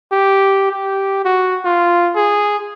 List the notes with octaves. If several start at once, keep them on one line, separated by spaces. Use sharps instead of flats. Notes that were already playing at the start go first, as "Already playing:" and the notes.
G4
G4
F#4
F4
G#4